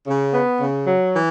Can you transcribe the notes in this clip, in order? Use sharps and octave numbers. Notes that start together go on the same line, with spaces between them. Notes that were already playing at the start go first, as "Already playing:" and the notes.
C#3
B3
C#3
F#3
E3